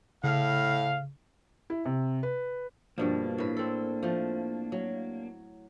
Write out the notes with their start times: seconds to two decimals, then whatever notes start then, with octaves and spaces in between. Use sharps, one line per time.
0.24 A2 C#3 F5
1.70 E4
1.85 C3
2.23 B4
2.98 G2 B2 F3 A#3 D4
3.38 A2 B4
3.57 C4 A4
4.03 F3 A3
4.72 F#3